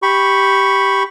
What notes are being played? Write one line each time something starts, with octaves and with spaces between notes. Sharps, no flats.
G4 B5 C#6